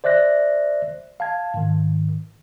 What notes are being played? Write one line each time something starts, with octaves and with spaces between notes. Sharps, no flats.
C5 D5 E5 F#6 A#6
F5 A5 G#6
G#2 D#3